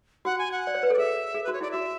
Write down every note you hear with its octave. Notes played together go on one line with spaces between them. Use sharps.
F#4 F#5
G#5
F#5
D5
C#5
B4
A4
D5
G#4 E5
G#4
F#4 B4
C#5
E4 D5
F#4 E5